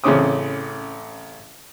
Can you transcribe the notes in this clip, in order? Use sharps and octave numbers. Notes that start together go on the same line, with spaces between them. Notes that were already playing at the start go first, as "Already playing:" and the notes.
A1 C#3 C4 C#4 D6 D#6